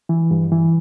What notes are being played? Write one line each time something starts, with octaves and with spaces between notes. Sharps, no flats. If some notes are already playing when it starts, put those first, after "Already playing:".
E3
G2
E3